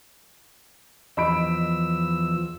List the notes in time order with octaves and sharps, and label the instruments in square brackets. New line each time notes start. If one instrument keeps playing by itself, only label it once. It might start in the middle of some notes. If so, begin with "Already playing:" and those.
[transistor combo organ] E2 F3 E6 [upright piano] D#5 B5 D7